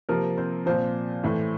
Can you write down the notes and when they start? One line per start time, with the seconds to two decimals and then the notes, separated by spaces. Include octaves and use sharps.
0.09 C3 F3 A#3 A#4
0.38 C4 C5
0.66 A#2 F3 C4 C5
1.24 A2 E3